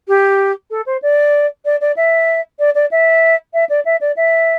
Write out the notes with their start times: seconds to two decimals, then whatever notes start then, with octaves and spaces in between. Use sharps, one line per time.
0.08 G4
0.71 A4
0.86 C5
1.02 D5
1.65 D5
1.81 D5
1.97 E5
2.59 D5
2.75 D5
2.91 E5
3.54 E5
3.69 D5
3.85 E5
4.01 D5
4.17 E5